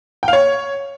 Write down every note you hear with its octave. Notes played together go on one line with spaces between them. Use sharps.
G5
F5
C#5